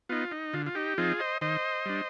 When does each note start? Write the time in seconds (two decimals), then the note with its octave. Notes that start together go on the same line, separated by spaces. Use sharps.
0.09 B3 D#4 F4
0.31 D#4
0.53 D3 F4
0.66 F4
0.75 D#4 G4
0.98 F3 C4 D#4 F4 G#4
1.19 C5 D#5
1.41 D#3 C5 D#5
1.86 G3 D4